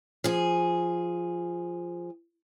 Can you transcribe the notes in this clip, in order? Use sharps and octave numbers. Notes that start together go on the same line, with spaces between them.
F3 G#4